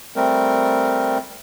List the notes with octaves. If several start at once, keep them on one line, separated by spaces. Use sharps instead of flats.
G3 A3 C4 A#4